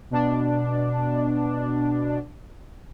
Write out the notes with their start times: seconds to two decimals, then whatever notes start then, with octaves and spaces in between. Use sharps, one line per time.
0.10 B2 D4